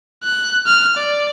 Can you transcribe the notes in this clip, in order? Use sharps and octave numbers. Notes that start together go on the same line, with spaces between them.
F#6
F6
D5